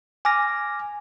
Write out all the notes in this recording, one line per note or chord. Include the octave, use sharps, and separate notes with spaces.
G#5 D6 F6 A#6